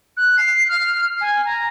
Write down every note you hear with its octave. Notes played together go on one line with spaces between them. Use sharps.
F#6
C7
F6
G#5
A#5